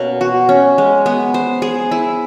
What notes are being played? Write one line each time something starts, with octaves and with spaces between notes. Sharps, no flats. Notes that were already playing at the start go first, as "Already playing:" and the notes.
Already playing: B2 A#3 C#4
F#4
C#4
G#3
B3
C5
G#4
E4